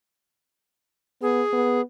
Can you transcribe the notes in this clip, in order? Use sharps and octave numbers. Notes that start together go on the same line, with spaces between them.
B3 G#4
B3